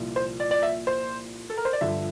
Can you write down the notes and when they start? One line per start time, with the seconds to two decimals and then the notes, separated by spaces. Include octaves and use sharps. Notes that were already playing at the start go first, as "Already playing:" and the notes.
Already playing: C2 A#2 F3
0.16 C5
0.40 D5
0.51 D5
0.63 E5
0.87 C5
1.50 A4
1.58 A#4
1.65 C5
1.73 D5
1.81 G1 G2 D3 F3 E5